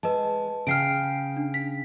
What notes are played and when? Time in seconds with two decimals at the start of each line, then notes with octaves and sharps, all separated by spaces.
0.03 G#3 B4 D#5 A5
0.67 C#3 G5 F6 C7 D7
1.37 D4
1.54 B6